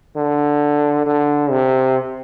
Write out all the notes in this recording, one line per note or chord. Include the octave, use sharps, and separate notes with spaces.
D3
D3
C3